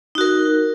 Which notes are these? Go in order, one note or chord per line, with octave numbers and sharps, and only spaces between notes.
D#4 F#4 A#4